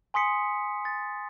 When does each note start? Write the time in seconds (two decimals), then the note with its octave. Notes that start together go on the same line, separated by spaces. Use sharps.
0.14 G#5 C6 D#6 B6 C#7
0.85 A6